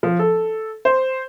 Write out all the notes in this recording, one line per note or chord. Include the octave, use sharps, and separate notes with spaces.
F3
A4
C5